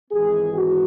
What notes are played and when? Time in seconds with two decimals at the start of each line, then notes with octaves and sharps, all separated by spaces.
0.11 G#1 G#2 E3 G#3 B3 G#4
0.54 F#4